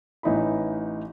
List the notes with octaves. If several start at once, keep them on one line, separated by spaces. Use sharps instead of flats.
A1 E3 D#4 E4 B5